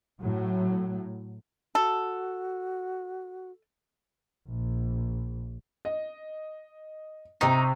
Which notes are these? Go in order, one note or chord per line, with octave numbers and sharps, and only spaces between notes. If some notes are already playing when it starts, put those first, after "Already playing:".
A2 F#3
F#4 A4
A#1
D#5
C3 C4 D#4 C#6